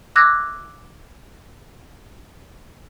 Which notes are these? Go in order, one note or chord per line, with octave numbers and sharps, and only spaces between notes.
D6 E6 F#6 G#6 A#6